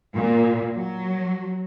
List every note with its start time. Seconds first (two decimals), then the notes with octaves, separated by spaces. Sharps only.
0.14 A#2
0.76 F#3